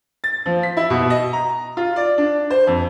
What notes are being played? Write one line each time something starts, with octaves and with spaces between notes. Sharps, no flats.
A6
F3
B6
E4
B2
D#5
A#5
F4
D5
D4
C5
F2